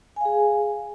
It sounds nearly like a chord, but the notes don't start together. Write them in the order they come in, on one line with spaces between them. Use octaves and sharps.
G#5 F5 G#4